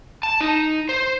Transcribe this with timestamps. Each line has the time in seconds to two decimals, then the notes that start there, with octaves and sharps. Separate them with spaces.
0.23 A5
0.41 D#4
0.89 C5